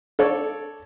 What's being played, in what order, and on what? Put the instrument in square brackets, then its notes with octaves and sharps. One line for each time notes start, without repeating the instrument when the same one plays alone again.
[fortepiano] A4 C#5 D5